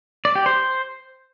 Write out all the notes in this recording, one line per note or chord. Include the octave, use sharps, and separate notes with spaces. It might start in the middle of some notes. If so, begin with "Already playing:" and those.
D5
G4
C5